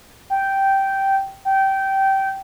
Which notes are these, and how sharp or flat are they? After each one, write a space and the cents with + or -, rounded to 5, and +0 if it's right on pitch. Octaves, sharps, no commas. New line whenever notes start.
G5 -10
G5 -20